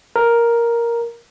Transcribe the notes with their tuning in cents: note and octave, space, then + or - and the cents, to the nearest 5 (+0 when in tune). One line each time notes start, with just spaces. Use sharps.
A#4 +5